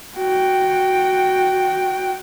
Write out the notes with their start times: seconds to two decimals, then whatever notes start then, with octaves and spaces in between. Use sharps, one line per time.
0.16 F#4 G5